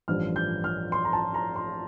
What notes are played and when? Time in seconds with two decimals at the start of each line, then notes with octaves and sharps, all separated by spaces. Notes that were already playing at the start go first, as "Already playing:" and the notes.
0.08 A1 G2 F3 F6
0.36 G6
0.64 F6
0.92 C6
1.05 A#5
1.13 A5
1.34 A#5
1.56 C6